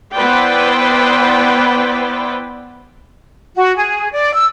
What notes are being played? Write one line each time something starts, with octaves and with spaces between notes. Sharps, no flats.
B3 E4 B4 C5 D5 G5
F#4
G#4
D5
E6